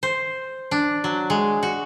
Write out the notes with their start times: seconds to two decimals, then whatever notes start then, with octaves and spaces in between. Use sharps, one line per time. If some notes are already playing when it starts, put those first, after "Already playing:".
0.03 C5
0.71 D4
1.04 F#3
1.30 G#3
1.63 F#4